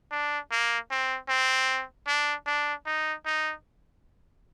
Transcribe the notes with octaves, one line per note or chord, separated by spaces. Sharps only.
D4
A#3
C4
C4
D4
D4
D#4
D#4